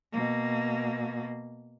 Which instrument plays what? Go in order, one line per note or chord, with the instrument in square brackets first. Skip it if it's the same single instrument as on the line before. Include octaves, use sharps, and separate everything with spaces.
[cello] B2 A#3